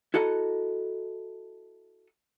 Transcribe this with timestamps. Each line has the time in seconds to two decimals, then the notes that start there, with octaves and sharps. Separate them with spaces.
0.14 E4 F#4 A4 D#5 A#5